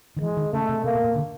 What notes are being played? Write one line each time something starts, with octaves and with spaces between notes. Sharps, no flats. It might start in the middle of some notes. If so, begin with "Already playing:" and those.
D#3
E3 G#3
D#3
C#3 A3
C3
C3 A#3
B2
A#2
D3